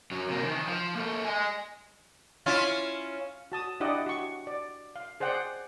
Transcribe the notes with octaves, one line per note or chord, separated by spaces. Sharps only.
F#2 F#3
C3 A#3
D#3 E3
F3
A#3 A4
D#5 G#5
C#4 E4 F4
F#4 A5 D#6
D4 E4 G4 D5 D#5 F#5
F#4 C#6
D5
F5
G#4 C5 D5 F#5 G5